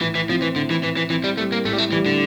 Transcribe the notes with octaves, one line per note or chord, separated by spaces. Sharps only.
A2 E3
E3
F3 C4
E3
A2 D3
E3
A2 E3
E3
E3 C4
G3
G3 A3
A#3
A2 A3
G3
A3
E3 G3
D3